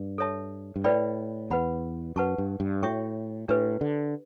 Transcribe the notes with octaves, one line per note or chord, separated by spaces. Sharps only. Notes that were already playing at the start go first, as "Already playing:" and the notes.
Already playing: G2
A4 C#5 E5 A5
G2
A2 B4 D5 G5 B5
E2 B4 F#5 B5
F#2 B4 F#5 A5 C#6
G2
G2
A2 F#4 C#5 E5 G5 C#6
A2 D4 G4 B4
D3